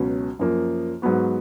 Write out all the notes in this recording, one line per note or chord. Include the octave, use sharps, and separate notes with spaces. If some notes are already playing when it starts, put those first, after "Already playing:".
Already playing: C#2 B2 F#3 C#4 F#4
F#2 F3 A#3
G#2 F#3 B3 F#4